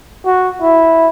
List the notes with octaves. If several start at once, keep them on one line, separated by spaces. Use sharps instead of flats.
F#4
E4